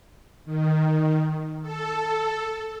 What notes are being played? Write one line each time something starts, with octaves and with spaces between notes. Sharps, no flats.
D#3
A4